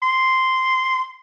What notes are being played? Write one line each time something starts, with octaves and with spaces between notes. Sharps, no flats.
C6